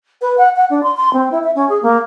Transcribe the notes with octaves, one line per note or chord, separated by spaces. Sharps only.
B4
F#5
F#5
D4
C6
C6
C4
E4
E5
C#4
G#4
A#3